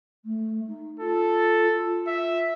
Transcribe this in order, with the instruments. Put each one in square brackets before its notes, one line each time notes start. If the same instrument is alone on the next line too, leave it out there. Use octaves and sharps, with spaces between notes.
[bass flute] A3
D#4
[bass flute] F4 [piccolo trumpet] A4
[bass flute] F4
[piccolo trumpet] E5